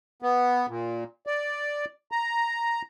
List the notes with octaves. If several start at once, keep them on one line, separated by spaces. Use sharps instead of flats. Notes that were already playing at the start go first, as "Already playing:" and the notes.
B3
A#2
D5
A#5